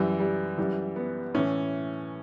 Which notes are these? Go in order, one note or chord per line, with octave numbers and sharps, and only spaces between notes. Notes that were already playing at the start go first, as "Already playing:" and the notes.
Already playing: F#2 E3 G3
G3
F#2 E3 G3
B3
A2 E3 C#4